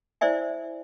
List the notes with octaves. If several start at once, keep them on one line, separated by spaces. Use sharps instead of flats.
E4 C5 D5 E5 G#5